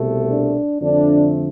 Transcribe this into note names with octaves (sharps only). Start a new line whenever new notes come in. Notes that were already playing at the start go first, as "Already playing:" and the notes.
Already playing: C2 B2 A3
D4
F2 D3 A3 D4